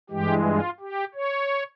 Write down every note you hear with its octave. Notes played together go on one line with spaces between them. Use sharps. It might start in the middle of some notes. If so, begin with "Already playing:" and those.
G2 E3 G#3 G4
F4
G4
C#5